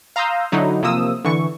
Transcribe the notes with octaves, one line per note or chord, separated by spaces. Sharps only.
F5 A#5 C6 D#6 E6 G6
D3 F#3 D#4 E4
C3 F3 A#3 D#6 E6
D3 E3 C#6